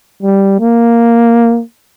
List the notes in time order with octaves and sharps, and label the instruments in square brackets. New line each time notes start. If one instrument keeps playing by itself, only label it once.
[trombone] G3
A#3